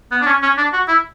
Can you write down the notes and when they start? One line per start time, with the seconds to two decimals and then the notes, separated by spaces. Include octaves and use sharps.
0.11 B3
0.21 D4
0.27 C#4
0.42 C#4
0.57 D4
0.73 F#4
0.88 E4